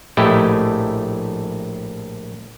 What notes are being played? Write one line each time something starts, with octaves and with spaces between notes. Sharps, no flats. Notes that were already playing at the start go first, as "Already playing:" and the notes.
A#1 A2 A3 E4 G4 D#5